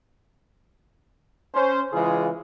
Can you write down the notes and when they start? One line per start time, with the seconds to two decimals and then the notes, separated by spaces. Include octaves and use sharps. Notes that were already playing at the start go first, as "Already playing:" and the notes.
1.54 C#4 C5
1.93 C#3 E3 G#3 F4 G#4